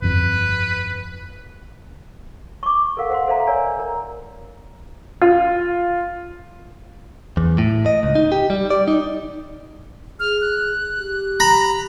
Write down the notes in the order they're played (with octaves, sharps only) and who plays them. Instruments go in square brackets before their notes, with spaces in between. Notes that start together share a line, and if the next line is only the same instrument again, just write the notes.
[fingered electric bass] G1 F2 [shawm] B4
[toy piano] C#6 D6
A4 A#4 F5 F#5
C5 F#5 C6
A4 C5 E5 F5 A#5
A#4 C#5 D5 G#5 A#5
A#4 A#5
[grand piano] F4
[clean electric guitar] E2
A2
D#5
C#2
D#4
G4
G3
D5
D#4
[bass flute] G#4 [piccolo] F6
[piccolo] F#6
[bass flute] G4
[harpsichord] A#5 B5